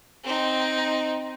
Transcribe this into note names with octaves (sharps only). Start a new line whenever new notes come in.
C4 D#4